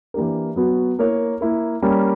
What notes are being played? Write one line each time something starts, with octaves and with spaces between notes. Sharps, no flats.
E3 A#3 D4 G4 A#4
F#3 B3 F#4
A#3 E4 A#4 C#5
A#3 E4 A#4
G3 A#3 C#4